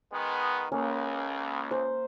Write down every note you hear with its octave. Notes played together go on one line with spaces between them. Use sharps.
D#3 G#3 B3
C#2 A#3 C#4
C5